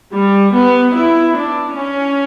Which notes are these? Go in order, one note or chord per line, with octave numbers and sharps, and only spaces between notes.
G3
B3
E4
D4
C#4